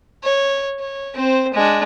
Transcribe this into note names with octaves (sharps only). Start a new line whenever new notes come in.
C#5
C#5
C4 C5
G#3 D4